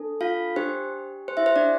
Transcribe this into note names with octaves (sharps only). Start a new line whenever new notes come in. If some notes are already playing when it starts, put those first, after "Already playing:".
Already playing: D4 A4
F4 F5
D4 G4 C5
C5
E4 E5
C5
D4 D5